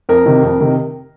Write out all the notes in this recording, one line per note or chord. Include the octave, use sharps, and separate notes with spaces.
F2 A#4
C3 D#3
F2
C3 D#3